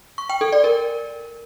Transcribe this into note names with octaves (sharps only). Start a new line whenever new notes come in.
C#6
G5
A4
D5
A#4